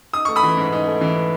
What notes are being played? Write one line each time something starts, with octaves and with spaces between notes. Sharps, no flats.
D#4 D#6
A3 C#6
B5 D#6
E3
G#2
D#4
A3
E3